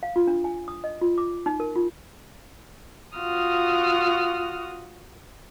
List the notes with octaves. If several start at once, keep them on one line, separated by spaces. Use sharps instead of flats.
F5
F4
D4
G#5
D#6
D#5
F4
D6
D#4
A#4
F4
F4 F#4 D#6 F6